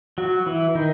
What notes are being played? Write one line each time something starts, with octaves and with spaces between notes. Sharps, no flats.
F#3 F#4
E3 E4
D#3 D#4